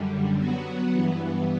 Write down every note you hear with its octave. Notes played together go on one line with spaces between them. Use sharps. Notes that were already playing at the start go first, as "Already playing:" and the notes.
Already playing: F#2 D3 G3
F#3 B3 F#4
G2 E3 B3